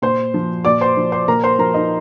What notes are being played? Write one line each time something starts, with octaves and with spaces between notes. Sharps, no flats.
A#2 C5 C6
F3
A#2 D5 D6
C5 C6
F3
C5 C6
A#2 A#4 A#5
C5 C6
F3 A#4 A#5
D#4 D#5